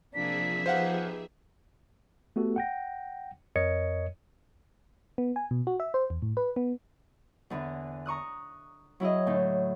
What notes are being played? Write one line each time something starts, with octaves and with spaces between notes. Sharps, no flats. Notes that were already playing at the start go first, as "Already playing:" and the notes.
C3 F3 A#3 D4 G#4 E5 B6
B3 D#4 G4 C5 F5 F#5
A3 B3 F#4 G4 A4
F#5 G5 A#6
F2 A#4 C#5 D#5 G#6 C#7
B3
G#5
B2
F#4
E5
C5
E2
A2
B4
B3
E2 D3 E3
A#5 C#6 D#6 F#6
F#3 E4 G#4 D#5
A2 D3 D#4